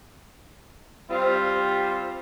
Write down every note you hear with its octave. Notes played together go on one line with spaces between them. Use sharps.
G3 C4 F4 G4 C5